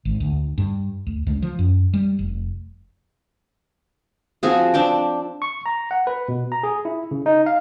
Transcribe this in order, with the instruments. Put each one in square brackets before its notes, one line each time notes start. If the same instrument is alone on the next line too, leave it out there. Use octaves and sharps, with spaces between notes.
[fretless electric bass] G#1
D2
G2
D2
C#2
F3
F#2
G3
F1
[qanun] F3 C4 F#4 G#4
C4 D4 G5 D6
[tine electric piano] C#6
A#5
F#5
B4
B2
A#5
G#4
E4
C#3
D#4
F5